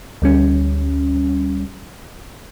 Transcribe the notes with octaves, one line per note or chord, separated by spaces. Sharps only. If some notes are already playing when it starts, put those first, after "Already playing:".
D2 G3 C#4